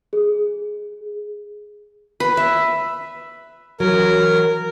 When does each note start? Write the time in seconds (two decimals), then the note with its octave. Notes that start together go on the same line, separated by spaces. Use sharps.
0.13 G#4
2.20 B4
2.37 E5
3.80 E3 F#3 A#4